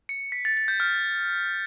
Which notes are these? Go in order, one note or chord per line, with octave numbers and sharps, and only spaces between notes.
C#7
B6
A6
A6
G6
F6